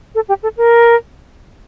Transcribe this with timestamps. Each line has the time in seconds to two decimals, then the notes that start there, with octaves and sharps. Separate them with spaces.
0.15 A4
0.29 G4
0.43 A4
0.57 A#4